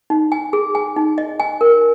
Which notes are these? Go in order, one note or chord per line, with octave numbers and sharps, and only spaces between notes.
D#4
G#5
G#4
G#5
D#4
D#5
G#5
A#4